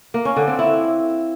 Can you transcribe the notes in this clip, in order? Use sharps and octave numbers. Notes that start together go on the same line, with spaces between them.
A#3
C#4
D3
C4
E4